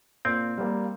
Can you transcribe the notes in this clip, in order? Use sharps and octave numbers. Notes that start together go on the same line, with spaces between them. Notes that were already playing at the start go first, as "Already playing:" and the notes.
A#2 C4
G3 A#3